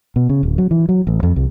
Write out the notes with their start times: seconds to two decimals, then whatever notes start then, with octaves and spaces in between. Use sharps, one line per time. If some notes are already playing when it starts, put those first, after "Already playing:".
0.16 B2
0.29 C#3
0.43 D1
0.58 F#3
0.71 E3
0.89 F#3
1.07 A1
1.23 F2
1.36 C2